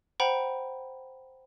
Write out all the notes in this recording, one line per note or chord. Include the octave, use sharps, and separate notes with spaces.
C5 F#5 G5 A#5 B5